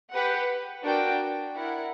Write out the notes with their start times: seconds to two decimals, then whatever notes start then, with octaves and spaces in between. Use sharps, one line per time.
0.12 G4 B4 F#5
0.84 D4 F#4 A#4 D5 G5
1.55 E4 A#4 D5 F#5